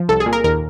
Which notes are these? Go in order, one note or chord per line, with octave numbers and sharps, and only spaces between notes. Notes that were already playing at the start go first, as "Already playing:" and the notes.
Already playing: F3
C2 A4
G#4
A#2
A#4
D#2 A#4